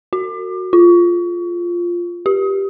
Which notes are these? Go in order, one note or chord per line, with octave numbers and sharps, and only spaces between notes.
F#4
F4
G4